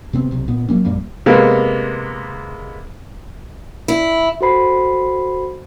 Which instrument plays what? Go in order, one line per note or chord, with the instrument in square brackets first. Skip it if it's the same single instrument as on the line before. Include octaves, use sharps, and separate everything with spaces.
[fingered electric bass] C3 B3 C4
B1 C3
A#2 B3
F#3 A#3 C#4
A#1 F#2 G3 A#3
[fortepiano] C3 G#3 A#3 B3
[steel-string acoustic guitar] E4
[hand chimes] F#4 A4 C5 B5 C7